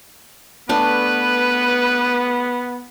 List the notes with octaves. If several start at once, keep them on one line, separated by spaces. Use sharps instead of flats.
A3 B3 D4 B4